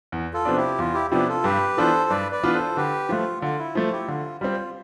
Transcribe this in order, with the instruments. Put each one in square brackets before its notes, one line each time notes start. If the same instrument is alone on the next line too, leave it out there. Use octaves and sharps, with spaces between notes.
[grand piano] E2
[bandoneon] F4 A4
[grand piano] C3 F3 B3 D4
[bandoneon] E4 G4
[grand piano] E2 [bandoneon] F4
[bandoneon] E4 G4
[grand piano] C3 F3 B3 D4 [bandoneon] E4 G4
[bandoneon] F4 A4
[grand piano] G2 [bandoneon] G4 B4
[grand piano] E3 B3 D4 F4 [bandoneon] A4 C5
[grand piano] G2 [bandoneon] B4 D5
[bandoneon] B4 D5
[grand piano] E3 B3 D4 F4
[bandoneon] A4 C5
[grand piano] D3 [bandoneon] G4 B4
[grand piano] F3 A3 [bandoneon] F4
[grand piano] D3 [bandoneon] F4
[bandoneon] E4
[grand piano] F3 A3 [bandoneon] F4
[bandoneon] E4 G4
[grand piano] D3 [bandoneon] F4
[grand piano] G3 C4 [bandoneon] F4